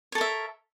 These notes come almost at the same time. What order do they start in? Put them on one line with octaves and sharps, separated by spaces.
C#5 A4 A#4 E5